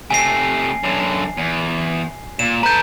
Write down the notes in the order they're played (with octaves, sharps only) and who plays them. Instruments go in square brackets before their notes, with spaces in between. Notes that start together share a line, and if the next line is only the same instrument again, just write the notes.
[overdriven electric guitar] C3 A3 [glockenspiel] G#5 C7
[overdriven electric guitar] F#2 D3
E2
[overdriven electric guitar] A#2 [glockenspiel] E7
[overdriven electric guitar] A4 B4 [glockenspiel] A#5 G6